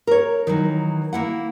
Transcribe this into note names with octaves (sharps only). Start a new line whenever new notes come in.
A#4 C#5
D#3 E3 F#3
A#3 E4 F#5